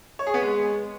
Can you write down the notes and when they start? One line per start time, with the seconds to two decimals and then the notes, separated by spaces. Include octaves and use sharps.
0.19 C#5
0.27 G#4
0.34 B3
0.41 G#3